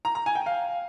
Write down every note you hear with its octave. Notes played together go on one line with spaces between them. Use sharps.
A#5
A#5
G#5
G5
F5